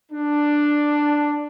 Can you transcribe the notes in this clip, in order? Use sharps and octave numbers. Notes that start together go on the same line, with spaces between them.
D4